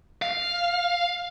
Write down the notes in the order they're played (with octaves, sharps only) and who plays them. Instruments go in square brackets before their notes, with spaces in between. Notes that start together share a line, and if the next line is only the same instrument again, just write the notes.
[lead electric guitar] F5